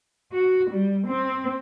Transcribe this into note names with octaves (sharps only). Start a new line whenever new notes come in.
F#4
G3
C4